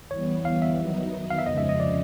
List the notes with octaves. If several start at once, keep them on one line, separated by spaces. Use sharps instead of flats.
E3 G3 B3 C#5
F5
E5
D#3 F#3 B3 D#4
F5
E5
F2 C#3 F3 G#3 D#5
E5
D#5
D5